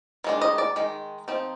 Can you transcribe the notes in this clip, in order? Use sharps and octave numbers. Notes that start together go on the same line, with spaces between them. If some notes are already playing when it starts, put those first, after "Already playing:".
D#3 G#3 D4
D#5
D5
D#3 G#3
F3 C4 D#4